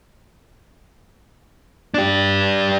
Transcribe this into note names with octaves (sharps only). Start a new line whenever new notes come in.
D4 G4